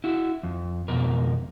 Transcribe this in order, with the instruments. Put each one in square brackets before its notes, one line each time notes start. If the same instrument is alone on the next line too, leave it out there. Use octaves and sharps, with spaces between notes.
[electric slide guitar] E4 F#4
F2
F2 B2 A#4